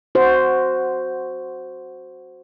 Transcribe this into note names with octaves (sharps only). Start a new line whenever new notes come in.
F#4 C5